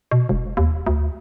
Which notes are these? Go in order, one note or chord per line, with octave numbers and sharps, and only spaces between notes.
B2
E1
D#2
D2